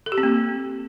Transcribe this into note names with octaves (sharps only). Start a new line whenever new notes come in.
A4
G4
C4
A#3